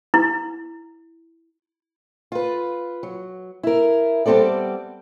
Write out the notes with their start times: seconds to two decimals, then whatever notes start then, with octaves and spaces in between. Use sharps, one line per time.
0.14 E4
2.32 F4 B4
3.03 F#3
3.63 E4 A#4
4.26 G3 B3 C4 A4 D5